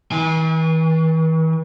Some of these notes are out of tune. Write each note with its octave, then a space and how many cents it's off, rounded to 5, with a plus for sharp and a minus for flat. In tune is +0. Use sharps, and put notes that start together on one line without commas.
E3 -45 G#5 -25